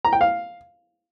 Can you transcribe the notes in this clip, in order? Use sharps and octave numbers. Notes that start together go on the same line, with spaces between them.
A#5
G5
F5